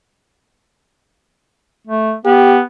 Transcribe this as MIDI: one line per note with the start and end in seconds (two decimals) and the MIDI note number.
1.87 2.14 57
2.25 2.61 59
2.25 2.59 67